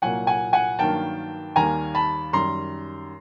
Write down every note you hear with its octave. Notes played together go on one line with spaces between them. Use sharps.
C2 A#2 F#3 A#3 F#5 G#5
F#5 G#5
F#5 G#5
G2 D#3 F#3 A#3 G5 A5
D#2 D#3 G3 A#3 G#5 A#5
A5 B5
F#2 D#3 G3 A#5 C6